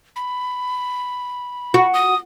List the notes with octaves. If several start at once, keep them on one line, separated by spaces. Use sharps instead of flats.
B5
F#4
D#6